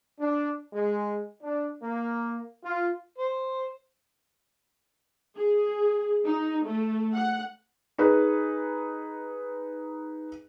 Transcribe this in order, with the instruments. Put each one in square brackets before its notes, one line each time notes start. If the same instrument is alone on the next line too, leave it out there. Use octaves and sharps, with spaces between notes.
[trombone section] D4
G#3
D4
A#3
F4
[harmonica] C5
[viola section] G#4
D#4
A3
F#5
[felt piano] D#4 G#4 B4